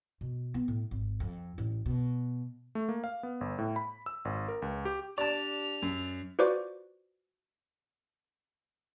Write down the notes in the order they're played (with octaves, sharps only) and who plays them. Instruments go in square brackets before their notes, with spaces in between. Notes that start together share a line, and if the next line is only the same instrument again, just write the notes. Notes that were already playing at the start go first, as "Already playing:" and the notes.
[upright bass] B2
B3
A2
G#1
F2
A1
B2
[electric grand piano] A3
A#3
F5
B3
G1
A2
B5
E6
G#1
A#4
C#2
G4
[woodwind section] D4 G4 [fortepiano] D5 A5 [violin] F7
[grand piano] F#2
[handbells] F4 F#4 B4 C5 D5 D6